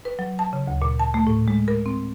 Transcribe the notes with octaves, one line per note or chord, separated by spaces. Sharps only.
B4
F#3
A5
C#3
D2
A#2
A5
A3
A2
G#3
A#4
C4